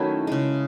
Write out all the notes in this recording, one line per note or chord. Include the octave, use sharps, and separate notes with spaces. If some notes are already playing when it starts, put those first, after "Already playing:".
Already playing: D#3 F#3 A3 C#4 E4
C#3 G#3